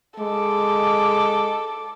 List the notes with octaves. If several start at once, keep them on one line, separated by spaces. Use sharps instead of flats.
G#3 A4 D6